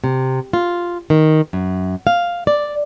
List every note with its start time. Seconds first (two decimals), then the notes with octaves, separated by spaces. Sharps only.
0.04 C3
0.53 F4
1.10 D#3
1.53 F#2
2.07 F5
2.47 D5